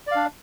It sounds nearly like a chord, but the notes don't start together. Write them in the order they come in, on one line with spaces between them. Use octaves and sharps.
D5 F5 D4